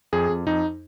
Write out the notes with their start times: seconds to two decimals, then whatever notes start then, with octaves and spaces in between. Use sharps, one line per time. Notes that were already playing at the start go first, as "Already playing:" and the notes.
0.13 F2 G#4
0.29 F2
0.46 F2 D#4